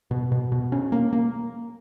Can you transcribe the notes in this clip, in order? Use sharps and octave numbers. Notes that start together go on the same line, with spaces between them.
B2
B2
B2
C#4
A#3
A#3